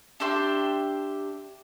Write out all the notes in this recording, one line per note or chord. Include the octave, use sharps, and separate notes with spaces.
D4 G4 E5 C6